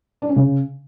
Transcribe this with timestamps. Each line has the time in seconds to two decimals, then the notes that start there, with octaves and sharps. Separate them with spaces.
0.22 D4
0.29 C#4
0.36 C#3